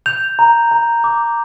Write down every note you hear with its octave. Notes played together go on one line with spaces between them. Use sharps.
G6 F7
A#5
A#5
D6